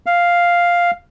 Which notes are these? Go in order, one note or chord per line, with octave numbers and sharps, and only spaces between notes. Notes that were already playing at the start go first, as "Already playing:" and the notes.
F5